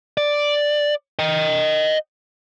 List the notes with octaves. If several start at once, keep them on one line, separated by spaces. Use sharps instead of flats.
D5
D#5 G5